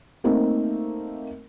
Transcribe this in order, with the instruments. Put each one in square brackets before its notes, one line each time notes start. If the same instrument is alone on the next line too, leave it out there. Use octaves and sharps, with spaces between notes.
[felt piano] A3 A#3 C4 D#4 A#4